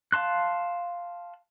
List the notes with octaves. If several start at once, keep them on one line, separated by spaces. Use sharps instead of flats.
F5 A5 C6 F#6